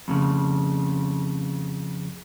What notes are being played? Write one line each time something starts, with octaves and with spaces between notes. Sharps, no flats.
F2 A#2 C#3